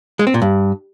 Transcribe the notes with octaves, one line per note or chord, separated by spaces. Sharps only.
G#3
C4
A#2
G2